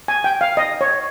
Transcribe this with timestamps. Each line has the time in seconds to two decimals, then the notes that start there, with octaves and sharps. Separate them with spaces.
0.08 G#5
0.24 G5
0.41 F5
0.57 D#5
0.81 C#5